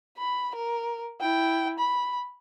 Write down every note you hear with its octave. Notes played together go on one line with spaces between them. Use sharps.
B5
A#4
E4 G5
B5